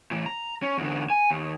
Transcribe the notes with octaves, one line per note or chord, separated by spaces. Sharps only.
A2 E3
A#5
C#4
E2 D3
G#5
D#2